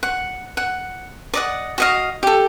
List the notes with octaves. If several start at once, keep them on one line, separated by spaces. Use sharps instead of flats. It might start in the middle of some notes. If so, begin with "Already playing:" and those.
F#5
F#5
D5 D#5 F#5
F#4 D#5 F5
G4 A4